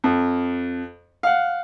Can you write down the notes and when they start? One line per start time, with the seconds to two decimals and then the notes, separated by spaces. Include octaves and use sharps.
0.04 F2
1.23 F5 F#5